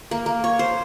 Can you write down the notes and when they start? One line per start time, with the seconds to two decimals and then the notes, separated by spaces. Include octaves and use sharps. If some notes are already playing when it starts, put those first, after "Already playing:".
0.11 A#3
0.26 A#3
0.44 C#5
0.59 C5